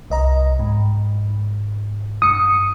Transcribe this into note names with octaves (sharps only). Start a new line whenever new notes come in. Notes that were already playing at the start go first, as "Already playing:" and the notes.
C2 D#5 A#5
G#2
G2 D#6 C#7